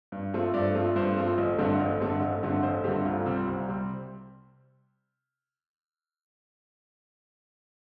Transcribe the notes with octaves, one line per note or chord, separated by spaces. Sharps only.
G2
F3 A3 C4
G2 D5
F3 A3 C4
G2 C5
F3 A3 C4
A1
G2 D3 A3 C4
A1
G2 D3 A3 C4
A1
G2 D3 A3 C4
A1 C5
G2 D3 A3 C4 G4
C2 F4
C3 G3 C4
C2
C3 G3 C4